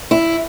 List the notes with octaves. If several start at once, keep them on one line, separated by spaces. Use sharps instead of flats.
E4